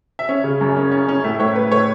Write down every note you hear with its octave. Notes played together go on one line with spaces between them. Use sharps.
E5
C#4 C#5
C#3
F#2
C#4
C#4
C#4
A2 E5
A2 C#5
A2 B4
A2 C#5